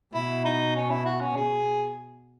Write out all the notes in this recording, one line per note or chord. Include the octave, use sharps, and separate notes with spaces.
B2 E4
D#4
C#4
E4
F#4
C#4
B2 G#4